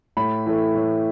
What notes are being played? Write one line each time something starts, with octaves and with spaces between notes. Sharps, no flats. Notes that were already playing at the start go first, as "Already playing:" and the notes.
A2 B5
E3 A3
A2